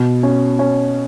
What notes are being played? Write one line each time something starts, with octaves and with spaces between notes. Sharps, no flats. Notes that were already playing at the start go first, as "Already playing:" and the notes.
Already playing: B2
C#4
C#4